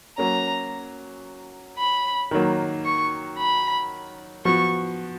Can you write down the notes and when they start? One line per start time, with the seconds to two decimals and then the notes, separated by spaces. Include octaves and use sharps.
0.18 F#3 A#3 C#4 A#5
1.78 B5
2.31 D#3 F#3 A#3
2.85 C#6
3.38 B5
4.45 F3 B3 F#4 C#6